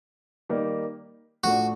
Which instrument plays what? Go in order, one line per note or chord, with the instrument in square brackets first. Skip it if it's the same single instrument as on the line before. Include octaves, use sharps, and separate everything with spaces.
[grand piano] D#3 G3 A#3 D#4
[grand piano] A2 F3 A3 D4 [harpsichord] F#4